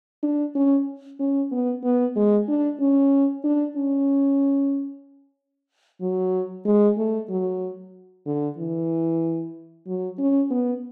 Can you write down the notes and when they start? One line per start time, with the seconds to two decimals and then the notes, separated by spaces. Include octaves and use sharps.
0.23 D4
0.55 C#4
1.19 C#4
1.51 B3
1.83 B3
2.16 G#3
2.48 D4
2.80 C#4
3.44 D4
3.77 C#4
6.01 F#3
6.65 G#3
6.98 A3
7.30 F#3
8.26 D3
8.58 E3
9.86 F#3
10.18 C#4
10.51 B3